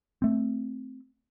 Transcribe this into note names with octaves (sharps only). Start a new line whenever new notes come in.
A3 C4